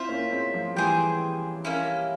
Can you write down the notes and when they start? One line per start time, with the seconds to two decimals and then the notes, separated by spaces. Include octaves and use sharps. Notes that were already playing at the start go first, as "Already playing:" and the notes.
Already playing: C4 E4 F4 C5 E5
0.09 A#3 C#4
0.32 G#3 C4
0.54 F3
0.76 E3 G3 G#4 C5 G5
1.65 A#3 C#4 E4